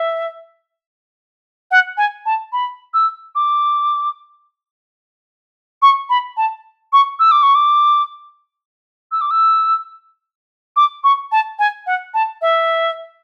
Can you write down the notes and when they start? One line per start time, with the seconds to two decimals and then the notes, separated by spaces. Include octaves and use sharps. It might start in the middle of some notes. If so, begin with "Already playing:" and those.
Already playing: E5
1.71 F#5
1.97 G#5
2.26 A5
2.53 B5
2.94 E6
3.35 D6
5.82 C#6
6.10 B5
6.37 A5
6.93 C#6
7.19 E6
7.32 D6
7.43 C#6
7.55 D6
9.12 E6
9.21 D6
9.31 E6
10.76 D6
11.04 C#6
11.32 A5
11.59 G#5
11.87 F#5
12.14 A5
12.42 E5